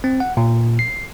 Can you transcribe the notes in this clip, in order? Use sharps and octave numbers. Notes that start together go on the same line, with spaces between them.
C4
F#5
A#2
C7